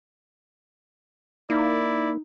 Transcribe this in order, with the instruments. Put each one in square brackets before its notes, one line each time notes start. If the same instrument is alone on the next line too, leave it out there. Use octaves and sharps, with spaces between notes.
[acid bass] A#3 [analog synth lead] D#4 [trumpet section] E4 D5